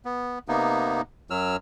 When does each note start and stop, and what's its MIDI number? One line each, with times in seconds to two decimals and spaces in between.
0.05 0.39 59
0.48 1.01 48
0.48 1.01 58
0.48 1.01 59
0.48 1.01 63
1.30 1.56 42
1.30 1.56 54
1.30 1.56 88
1.30 1.56 89